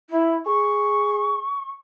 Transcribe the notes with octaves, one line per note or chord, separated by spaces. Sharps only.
E4
G#4 C#6